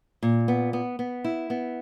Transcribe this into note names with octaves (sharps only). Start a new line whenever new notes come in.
A#2
B3
B3
B3
E4
B3